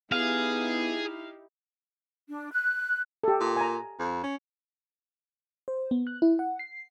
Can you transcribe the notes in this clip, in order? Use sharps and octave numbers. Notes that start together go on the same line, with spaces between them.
B3 D#4 E4 G4 G#4 F5
D4
F#6
G4 A4
A#2
G#5 A#5
F2
C#4
C5
B3
F#6
E4
F#5
C7